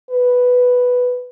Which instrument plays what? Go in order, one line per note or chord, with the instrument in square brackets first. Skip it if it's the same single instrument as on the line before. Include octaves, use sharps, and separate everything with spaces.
[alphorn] B4